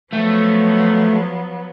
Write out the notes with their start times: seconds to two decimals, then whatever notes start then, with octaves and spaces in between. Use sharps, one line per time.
0.13 F3 F#3 A3 B3